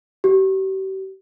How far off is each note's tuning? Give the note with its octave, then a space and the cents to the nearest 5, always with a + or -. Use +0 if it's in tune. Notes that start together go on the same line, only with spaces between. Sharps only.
G4 -40